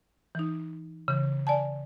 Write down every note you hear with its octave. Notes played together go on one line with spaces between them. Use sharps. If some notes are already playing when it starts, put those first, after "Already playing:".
E3 D#4
C#3 E3
D5 G#5 A5